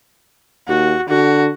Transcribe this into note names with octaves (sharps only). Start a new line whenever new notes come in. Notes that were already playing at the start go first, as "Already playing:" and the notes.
D#2 F#4
D3 F#4